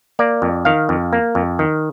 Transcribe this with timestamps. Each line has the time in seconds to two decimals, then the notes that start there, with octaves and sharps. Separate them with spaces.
0.19 A#3 D5
0.42 F2
0.65 D#3 F5
0.89 F2
1.13 A#3
1.35 F2
1.59 D#3